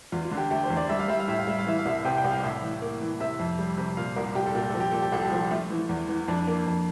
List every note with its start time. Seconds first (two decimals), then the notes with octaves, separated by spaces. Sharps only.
0.12 E2 F4
0.25 F4
0.31 D3
0.38 G4
0.51 A3 G4
0.64 C5
0.70 E2
0.77 D5
0.89 G3 E5
0.99 F5
1.08 G3 E5
1.20 F5
1.28 A2 E5
1.39 F5
1.47 G3 E5
1.59 F5
1.66 E3 E5
1.79 F5
1.86 C2 E5
2.05 C3 G5
2.17 G5
2.24 C2
2.31 F5
2.43 A2 E5
2.62 E3
2.82 A#3
3.01 E3
3.20 C3 E5
3.39 F2
3.59 G3
3.78 C3
3.97 A#2 F5
4.16 C2 A#4
4.35 C2 G4
4.46 A4
4.55 A#2 G4
4.69 F3 A4
4.80 G4
4.91 A#2 A4
5.02 G4
5.12 C2 A4
5.25 G4
5.32 F3
5.51 A3 F4
5.70 E3
5.89 E2
6.09 E3
6.28 F2 D4
6.47 A#3
6.66 F2